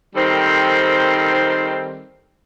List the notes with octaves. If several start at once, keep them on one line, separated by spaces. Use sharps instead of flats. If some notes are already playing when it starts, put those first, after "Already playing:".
D#3 G3 C4 A4 A#4 C5